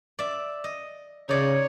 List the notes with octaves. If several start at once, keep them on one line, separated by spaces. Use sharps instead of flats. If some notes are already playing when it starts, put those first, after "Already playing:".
D5 E5
D#5
C#3 D#4 C#5 D5